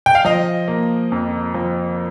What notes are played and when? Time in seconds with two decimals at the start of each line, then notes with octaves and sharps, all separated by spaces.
0.06 G5
0.15 F5
0.25 F3 D#5
0.68 A#3
1.12 F2
1.54 F3